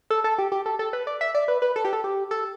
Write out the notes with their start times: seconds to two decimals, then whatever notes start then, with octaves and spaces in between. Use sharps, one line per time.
0.10 A4
0.24 A4
0.38 G4
0.52 G4
0.66 A4
0.79 A4
0.93 B4
1.07 D5
1.21 E5
1.35 D5
1.48 B4
1.62 B4
1.76 A4
1.85 G4
1.93 A4
2.04 G4
2.31 A4